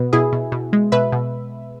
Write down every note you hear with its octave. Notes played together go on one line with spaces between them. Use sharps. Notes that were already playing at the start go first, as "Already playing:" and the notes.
Already playing: B2 B3
B2 E4 G#4
B2
B2
G#3
B2 B4 E5
B2